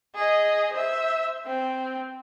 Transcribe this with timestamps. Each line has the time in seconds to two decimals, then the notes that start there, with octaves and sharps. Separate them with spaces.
0.15 G#4 D#5
0.73 C5 E5
1.46 C4